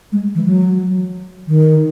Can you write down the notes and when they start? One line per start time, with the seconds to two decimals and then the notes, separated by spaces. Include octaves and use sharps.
0.12 G#3
0.35 E3
0.46 F#3
1.47 D#3